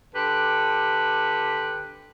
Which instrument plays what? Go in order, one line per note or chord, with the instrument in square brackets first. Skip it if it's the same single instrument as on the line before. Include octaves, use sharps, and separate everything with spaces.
[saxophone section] D3 G4 B4